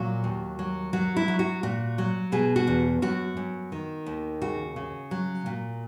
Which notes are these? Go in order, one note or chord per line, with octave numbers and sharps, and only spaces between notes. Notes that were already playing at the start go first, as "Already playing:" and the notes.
Already playing: A#2 F#3 F#4
D#2
F#3
F#3 F#4
E4
F#3
F#4
A#2 F#4
F#3
B2 G#4
F#4
E2
F#2 F#4
F#2
D#3
D#2
C#3 F#4
C#3
F#3
A#2